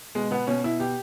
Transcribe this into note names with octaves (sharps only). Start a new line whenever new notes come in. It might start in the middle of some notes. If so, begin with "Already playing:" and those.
B2 G#3
B2 B3
B2 C#4
B2 E4
B2 G4